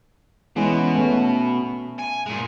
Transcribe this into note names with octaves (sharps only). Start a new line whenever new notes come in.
B2 E3 G#3 C#4
A3 B3 C#4
G#5
A#2 G#3